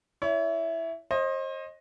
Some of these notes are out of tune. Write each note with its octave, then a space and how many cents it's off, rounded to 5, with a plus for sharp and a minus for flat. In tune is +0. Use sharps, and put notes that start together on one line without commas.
E4 +0 C#5 +30
C5 +35 D#5 +0